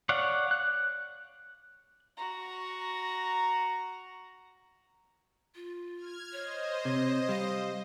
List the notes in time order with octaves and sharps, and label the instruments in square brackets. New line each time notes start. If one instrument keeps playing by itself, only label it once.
[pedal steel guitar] C#5 D5 F5 F#5
F#6
[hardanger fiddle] F#4 A#5
[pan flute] F4
[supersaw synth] F6 G#6
[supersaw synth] C5 D#5 [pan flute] C#5
[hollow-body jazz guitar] C3
[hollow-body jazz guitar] G3 [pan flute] F5